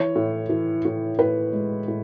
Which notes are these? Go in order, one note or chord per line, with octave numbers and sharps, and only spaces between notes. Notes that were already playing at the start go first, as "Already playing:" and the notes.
Already playing: E3 C#5
A2
E3
A2
A2 B4
G#3
A2